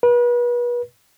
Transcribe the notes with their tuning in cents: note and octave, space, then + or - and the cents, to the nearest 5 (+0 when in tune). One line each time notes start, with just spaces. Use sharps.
B4 -35